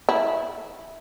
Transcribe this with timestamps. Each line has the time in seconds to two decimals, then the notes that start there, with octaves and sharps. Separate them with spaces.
0.09 E4